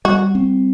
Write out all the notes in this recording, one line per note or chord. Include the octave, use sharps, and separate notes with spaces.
G3 F#4
C4